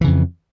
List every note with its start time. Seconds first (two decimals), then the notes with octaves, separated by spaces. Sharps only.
0.01 E3
0.04 C#3
0.07 F2